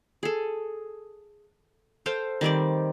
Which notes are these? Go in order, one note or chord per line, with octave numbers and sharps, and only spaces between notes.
G#4 A4
A4 C5 F5 G5
D#3 G3 C4 D5